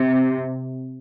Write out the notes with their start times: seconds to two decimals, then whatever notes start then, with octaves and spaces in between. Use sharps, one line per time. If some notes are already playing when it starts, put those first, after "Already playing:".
Already playing: C3